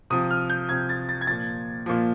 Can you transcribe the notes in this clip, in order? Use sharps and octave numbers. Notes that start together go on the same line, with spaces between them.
C3 F3 D#6
F6
G6
C3 F3 G#6
A6
A6
G#6
A#2 F3 A6
A#2 F3